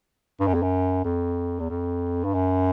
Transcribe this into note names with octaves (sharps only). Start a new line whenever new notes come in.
G2
F#2
F2
F#2
F2
E2
F2
G2
F#2